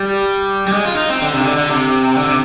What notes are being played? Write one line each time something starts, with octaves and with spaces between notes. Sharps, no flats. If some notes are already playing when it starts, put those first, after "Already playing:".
Already playing: G3
G3
G#3
F4
D#4
C4
D3
C3
D#3
D3
D3
C3
D3
C3